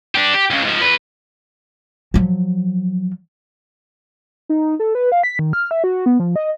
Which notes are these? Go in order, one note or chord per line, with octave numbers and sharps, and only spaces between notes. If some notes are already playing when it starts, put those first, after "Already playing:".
D4 G4
G4
C#2 C#3
G#2 F3
E2 B4
F3 F#3
D#4
A4
B4
F5
B6
D#3
F6
E5
F#4
B3
F3
D#5